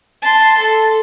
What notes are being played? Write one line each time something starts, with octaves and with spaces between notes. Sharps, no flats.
A5 C6
A4